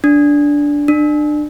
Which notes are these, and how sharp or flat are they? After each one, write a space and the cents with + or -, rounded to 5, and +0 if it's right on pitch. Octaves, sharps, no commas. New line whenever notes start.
D4 -10
D4 +30